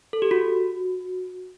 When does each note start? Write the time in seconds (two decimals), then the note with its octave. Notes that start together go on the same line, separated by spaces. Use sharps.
0.13 A4
0.22 G4
0.31 F#4